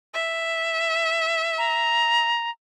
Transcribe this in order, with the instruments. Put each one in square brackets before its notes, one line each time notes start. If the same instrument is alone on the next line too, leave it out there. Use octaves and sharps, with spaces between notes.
[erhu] E5
[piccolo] A#5